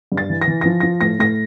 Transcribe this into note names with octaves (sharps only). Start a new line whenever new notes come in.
G2
A6
E3
A#6
E3
F3 A#6
F3 A#6
A2 A#6
A2 A#6